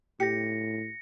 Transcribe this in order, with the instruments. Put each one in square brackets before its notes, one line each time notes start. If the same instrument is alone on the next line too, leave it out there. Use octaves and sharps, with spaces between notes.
[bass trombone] A2 [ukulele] G4 [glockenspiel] A#6 C#7